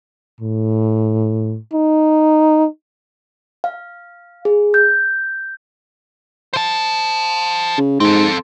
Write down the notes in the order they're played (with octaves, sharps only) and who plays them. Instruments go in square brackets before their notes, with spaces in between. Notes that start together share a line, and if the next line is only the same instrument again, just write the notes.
[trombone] A2
D#4
[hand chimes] F5
G#4
G6
[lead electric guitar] C5 A5
[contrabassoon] C#3
[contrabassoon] G#2 [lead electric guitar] C4 A4